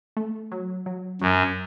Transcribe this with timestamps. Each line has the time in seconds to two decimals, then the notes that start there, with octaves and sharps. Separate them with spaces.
0.17 A3
0.52 F#3
0.86 F#3
1.21 F#2 F#3